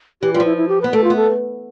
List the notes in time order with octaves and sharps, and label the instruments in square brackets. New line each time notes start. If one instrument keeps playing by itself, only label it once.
[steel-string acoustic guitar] E3 [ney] G4
[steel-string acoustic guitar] G3 [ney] F4
[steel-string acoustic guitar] F3
[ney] E4
E4
G4
[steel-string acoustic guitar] B3 [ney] B4
[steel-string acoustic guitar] A3 [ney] A4
[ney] F4
[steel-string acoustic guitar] B3
[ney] A4